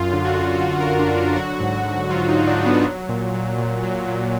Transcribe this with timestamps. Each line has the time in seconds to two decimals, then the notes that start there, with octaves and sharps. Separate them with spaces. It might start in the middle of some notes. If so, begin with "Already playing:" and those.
Already playing: F#2 F4
0.13 D3
0.25 F#4
0.38 F#2
0.54 F4
0.62 D3 F#4
0.80 A#4
0.87 F#2
0.99 D4
1.12 D3
1.18 F4
1.36 F#3 F#4
1.60 G#2
1.86 G#2
2.10 F#3 F4
2.29 D#4
2.34 F#3
2.47 D4
2.59 F#3
2.66 B3
2.85 F#3
3.09 A#2
3.34 F#3
3.58 A#2
3.83 F#3
4.08 A#2